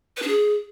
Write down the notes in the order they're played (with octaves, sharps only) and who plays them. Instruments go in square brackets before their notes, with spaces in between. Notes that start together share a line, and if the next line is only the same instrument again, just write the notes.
[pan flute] B4
D4
G#4